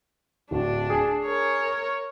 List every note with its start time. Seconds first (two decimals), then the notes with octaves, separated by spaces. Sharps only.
0.51 D1 D4 F#4
0.90 G#4
1.25 A#4 C#5